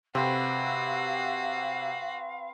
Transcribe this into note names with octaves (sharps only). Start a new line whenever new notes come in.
C3 C4 F#4 B4 F5